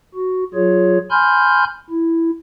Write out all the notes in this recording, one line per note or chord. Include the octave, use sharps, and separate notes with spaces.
F#4
F#3 F4 G#4 C#5
G#5 B5 C6 F6 G6
E4